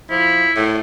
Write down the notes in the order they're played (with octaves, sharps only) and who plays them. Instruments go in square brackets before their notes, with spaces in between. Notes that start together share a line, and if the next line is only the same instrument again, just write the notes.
[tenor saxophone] F3 [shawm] E4
[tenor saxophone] A2